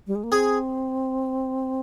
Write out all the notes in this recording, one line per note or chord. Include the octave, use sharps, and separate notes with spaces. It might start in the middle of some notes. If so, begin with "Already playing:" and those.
G3
G#3
A#3
C4 G#4